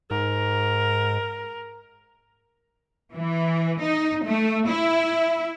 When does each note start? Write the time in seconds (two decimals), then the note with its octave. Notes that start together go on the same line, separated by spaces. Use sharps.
0.11 G#2 A#4
3.14 E3
3.81 D#4
4.26 A3
4.67 E4